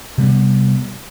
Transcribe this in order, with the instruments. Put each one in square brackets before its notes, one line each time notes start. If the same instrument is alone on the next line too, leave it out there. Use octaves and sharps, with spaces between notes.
[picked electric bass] C3 G3 B3